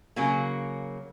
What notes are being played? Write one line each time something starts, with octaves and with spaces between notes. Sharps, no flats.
C#3 F#3 A#3